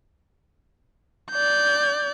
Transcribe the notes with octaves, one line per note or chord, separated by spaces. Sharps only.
D5 G6